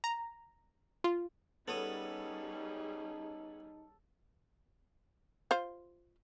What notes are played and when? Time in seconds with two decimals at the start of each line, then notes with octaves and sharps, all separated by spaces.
0.04 A#5
1.04 F4
1.68 G3 B3 C#4 D#4 G#4 A4 C#5 D#6
5.51 F4 C5